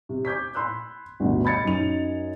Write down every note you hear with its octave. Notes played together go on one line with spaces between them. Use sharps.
C3
D6 G6 G#6 B6
B5 C6 E6 F#6
G1 D2 G2 B2
D#5 B5 G#6 A6 C#7
F#2 D#4 F7